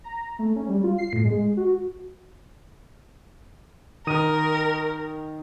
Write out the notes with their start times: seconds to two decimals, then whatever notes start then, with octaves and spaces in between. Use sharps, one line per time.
0.04 A#5
0.39 A3
0.56 C#4
0.69 G3
0.84 F4
0.98 C7
1.13 A2
1.25 G#3
1.57 F#4
4.07 D#3 A#4 D#6 D#7